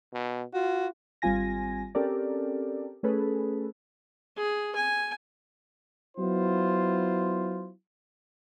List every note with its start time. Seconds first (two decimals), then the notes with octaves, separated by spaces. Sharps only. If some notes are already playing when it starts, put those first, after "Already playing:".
0.14 B2
0.54 F4 F#4
1.22 G#1 G3 C4 F4 G#5 A#6
1.95 C4 C#4 G4 A4 A#4 D5
3.03 A3 C#4 G#4 A4 B4
4.37 G#4
4.76 G#5
6.18 F#3 B3 E4 F4 C5